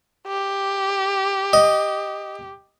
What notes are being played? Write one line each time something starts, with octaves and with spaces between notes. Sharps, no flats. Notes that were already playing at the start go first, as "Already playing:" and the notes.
G4
D#5